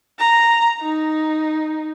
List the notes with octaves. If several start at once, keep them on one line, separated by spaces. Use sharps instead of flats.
A#5
D#4